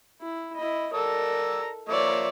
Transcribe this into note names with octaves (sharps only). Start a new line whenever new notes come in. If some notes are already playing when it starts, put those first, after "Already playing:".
E4
E4 D#5 B5
A4 A#4 D5 A#5 E6
F3 A#3 C#5 D5 E5